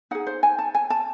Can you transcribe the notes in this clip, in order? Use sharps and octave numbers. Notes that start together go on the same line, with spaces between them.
D#4 G#4 F#5
C5
G#5
A5
G#5
A5